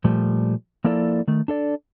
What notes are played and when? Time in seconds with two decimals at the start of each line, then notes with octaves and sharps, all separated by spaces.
0.04 A#2 F3 G3 A3
0.84 F3 A#3 E4 A4 D5
1.28 D#3 A3
1.48 D4 A4 D5